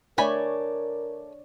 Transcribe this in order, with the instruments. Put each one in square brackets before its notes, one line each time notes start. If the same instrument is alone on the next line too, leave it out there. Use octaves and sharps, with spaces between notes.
[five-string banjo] A3 G#5 B5 [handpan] D4 C#5 D5 [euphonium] A#4